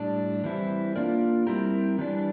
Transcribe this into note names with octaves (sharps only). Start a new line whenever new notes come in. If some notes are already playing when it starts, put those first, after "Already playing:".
Already playing: A2 G3 D4
E3 G3 C4 E4
A#3 D4 F4 A#4 D5
G3 C4 E4 G4 A#4
E3 G3 D4